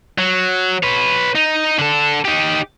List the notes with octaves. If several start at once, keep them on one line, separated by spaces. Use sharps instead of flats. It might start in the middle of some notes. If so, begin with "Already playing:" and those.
F#3
B4 C#5
D#4
D3 A4
D#4 G4